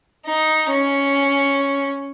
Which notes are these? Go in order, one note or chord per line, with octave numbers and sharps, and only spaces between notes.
D#4
C#4